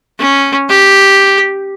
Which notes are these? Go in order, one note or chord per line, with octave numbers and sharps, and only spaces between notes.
C#4
G4